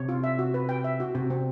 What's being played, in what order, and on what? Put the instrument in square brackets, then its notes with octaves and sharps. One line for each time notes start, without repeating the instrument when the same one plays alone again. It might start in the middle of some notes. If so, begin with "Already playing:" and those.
Already playing: [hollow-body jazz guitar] C3 [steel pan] C#5
[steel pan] F4
E5
F#4
B4
G5
E5
F#4
[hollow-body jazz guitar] C3 [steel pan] F#4
[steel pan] C4